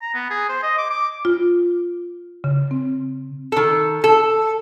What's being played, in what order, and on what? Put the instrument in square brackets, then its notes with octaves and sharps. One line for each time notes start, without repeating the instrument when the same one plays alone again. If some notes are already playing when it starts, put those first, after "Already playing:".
[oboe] A#5
B3
G#4
C5
D#5
D6
D6
[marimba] F4
C#3
C4
[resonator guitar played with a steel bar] D#3 A4
A4